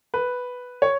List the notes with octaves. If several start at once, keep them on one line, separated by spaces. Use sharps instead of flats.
B4
C#5